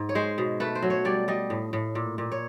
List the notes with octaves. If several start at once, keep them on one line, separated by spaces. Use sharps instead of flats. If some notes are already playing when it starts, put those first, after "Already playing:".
Already playing: G#2
C#5
G#3 C5
B2
A3 B4
C5
F#3
C#5
G3 D5
G3 D#5
A2
A2
A#2
A#2
C#5